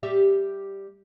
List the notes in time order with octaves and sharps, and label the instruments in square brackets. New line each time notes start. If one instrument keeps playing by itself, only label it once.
[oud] G3 G4 E5